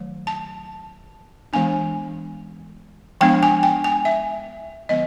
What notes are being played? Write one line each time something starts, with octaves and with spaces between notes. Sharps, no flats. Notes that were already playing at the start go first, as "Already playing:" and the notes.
Already playing: D#3 F#3 A3
A5
E3 G#3 B3 D4 G#5
F3 G#3 B3 D4 G5
G#5
G5
G#5
E5
D3 F3 G#3 B3 D#5